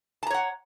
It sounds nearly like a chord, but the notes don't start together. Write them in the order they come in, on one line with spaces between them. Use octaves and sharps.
A5 A#5 C#5 F#5